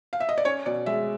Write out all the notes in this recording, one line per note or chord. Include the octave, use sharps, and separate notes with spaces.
F5
E5
D#5
D5
C#4 C#5
B2 D5
G#3 E5